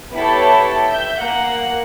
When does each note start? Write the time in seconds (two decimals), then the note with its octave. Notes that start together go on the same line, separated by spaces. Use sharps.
0.14 B3 E4 G4 A4 C#5
0.88 E5 G6
1.20 A#3 F#5